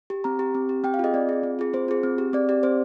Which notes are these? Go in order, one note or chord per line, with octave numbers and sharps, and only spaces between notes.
G4
C4 A#5
G4
C4
G4
C4 G5
F5
F4 G#4 D#5
C4 D5
F4 G#4
C4
F4 G#4
C4 C5
F4 G#4
C4
G4
C4 D5
G4 D5
C4 C5